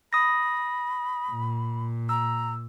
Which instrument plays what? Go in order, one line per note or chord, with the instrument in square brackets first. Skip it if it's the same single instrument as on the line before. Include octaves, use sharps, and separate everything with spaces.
[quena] B5 [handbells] D#6 A#6
[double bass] A#2
[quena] A#5 [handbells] E6